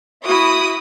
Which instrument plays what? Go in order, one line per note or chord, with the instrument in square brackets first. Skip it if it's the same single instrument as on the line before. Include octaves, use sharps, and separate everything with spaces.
[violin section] E4 D#6 [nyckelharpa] F#4 B5